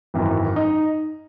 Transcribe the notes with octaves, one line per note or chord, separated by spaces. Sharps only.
G#1 F#2 E3
D#4